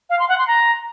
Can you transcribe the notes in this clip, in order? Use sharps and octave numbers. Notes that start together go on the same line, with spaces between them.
F5
C6
F#5
C6
A#5